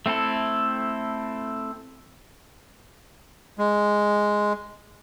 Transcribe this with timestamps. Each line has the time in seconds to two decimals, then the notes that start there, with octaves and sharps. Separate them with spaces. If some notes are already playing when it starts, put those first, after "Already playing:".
0.06 A3 C4 E4 A4
3.59 G#3